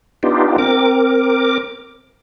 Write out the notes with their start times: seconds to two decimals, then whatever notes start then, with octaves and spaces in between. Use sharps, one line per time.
0.23 B3 D4 D#4 F4 G4
0.58 C4 A#4 D6